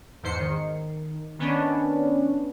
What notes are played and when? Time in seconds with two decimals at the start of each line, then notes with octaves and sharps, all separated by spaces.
0.23 E2 G#2 C5 C7 C#7
0.39 D#3
1.39 D#3 B3 C#4 D4